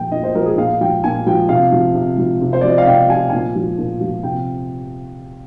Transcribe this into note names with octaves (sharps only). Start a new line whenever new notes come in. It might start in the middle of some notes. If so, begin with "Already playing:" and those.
Already playing: A#2 F3 G5
A#2 D#5
C5
F3 A#4
G#4
A#2 F5
F3 G5
A#2 G#5
F3 G5
C3 F5
F3
C3
F3
C3
C5
F3 D5
D#5
F5
C3 G5
F3 G#5
A#2 G#5
F3
A#2
F3
C3 G5